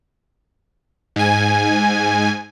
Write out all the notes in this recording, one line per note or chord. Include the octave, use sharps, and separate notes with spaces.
G#2 G#5